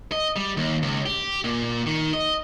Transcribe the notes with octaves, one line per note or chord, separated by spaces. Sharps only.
D#5
G3
D#2
C#2
G4
A#2
D#3
D#5